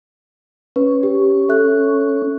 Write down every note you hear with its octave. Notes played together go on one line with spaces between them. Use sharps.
C#4 B4
G4
A4 E5 F#6